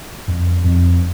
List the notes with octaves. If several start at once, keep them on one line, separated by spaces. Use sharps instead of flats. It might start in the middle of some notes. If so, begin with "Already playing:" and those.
F2
F2